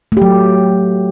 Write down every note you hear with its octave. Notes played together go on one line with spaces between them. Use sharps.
F#3 A3 G4